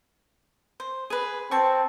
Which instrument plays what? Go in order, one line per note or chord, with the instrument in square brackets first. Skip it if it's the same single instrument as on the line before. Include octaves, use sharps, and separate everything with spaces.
[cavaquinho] C5
G#4 B4
[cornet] C4 [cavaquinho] A5 C#6